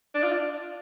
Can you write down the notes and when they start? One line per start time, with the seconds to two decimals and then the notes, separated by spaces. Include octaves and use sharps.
0.14 D4
0.23 F4
0.32 D4